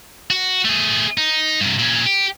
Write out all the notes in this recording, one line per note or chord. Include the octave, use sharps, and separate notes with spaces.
F#4
A3 G#4
D#4
G2 C3
A#2 C#4
G4